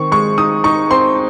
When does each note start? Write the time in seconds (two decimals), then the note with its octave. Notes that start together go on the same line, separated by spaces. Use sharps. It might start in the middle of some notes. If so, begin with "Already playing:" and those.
Already playing: D#3 C4 C#6
0.12 G#3 C#6
0.38 D#4 D#6
0.64 D#4 C#6
0.91 C4 C6